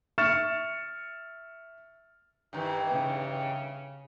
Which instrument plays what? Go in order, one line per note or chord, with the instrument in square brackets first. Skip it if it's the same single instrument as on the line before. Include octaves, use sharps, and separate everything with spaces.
[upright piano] E5 C#6 F6 A6 C#7 E7
[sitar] G2 D#3 E3
[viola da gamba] C#3